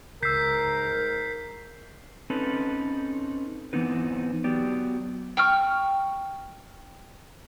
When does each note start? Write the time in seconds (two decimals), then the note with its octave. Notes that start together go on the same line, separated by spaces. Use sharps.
0.23 C#2 G#2 A#4 E6 G6 B6 C7
2.30 C4 C#4 D#4 A4 B4
3.73 E3 B3 C4 D#4 B4
4.44 F#3 B3 G4 D5
5.37 G5 C#6 F6